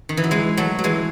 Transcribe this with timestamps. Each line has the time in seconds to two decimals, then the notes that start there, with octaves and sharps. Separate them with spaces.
0.09 D#3
0.17 E3
0.24 F#3
0.31 E3 G#3
0.57 F#3 A3
0.79 F#3
0.84 E3 G#3